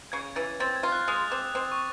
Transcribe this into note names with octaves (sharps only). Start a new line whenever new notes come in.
C#3 G#6
E3 A6
C4 A6
G#6
F4
F#6
G#3 D#6
C4 D6
C4
C#6